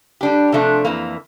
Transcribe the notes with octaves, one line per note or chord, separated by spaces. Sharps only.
G3 D4 G4
C3 F3 A3 D4 F4
F2 E3 A#3